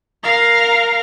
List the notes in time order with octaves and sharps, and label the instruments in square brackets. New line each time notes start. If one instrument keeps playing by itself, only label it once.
[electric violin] A#4 F5